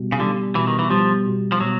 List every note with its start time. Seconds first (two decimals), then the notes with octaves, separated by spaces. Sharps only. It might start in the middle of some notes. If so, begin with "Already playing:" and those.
Already playing: B2 G3
0.12 C#3
0.19 D3 G3
0.55 B2 E3
0.67 D#3
0.79 E3
0.90 F3 G3
1.26 B2
1.52 F3
1.60 B2 F#3